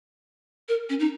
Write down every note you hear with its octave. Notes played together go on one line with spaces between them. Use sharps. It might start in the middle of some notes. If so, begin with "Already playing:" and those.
A#4
C#4
D#4